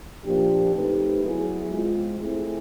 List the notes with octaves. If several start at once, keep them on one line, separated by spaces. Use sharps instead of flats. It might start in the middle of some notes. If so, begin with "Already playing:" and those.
A#2 F3 A#3 D4 G4
A3 C4 D#4 G4 B4
F#3 B3 E4 G#4
G#3 C4 F4
A3 C4 E4 G#4